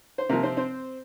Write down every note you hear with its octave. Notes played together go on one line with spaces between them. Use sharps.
C5
C3 F3 A#3 A#4
C4 C5
C4 C5